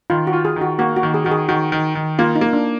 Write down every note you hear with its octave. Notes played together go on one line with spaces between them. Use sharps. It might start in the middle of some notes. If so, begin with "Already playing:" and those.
D#3 F4
F#4
F4
G#4
D#3
F#4
A#3 F#4
F#4
D#3
G#4
D#3 F#4
G#4
D#3 F#4
D#3
D#3
A#3 F4
D#4
A#3
D4